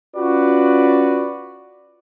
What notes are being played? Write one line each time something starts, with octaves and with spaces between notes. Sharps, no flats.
C#4 F4 F#4 B4 D5